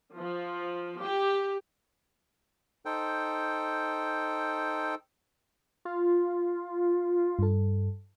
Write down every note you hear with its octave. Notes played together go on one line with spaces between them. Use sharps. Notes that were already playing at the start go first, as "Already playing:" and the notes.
F3
G4
D#4 A4 C5 G5
F4
G2 A4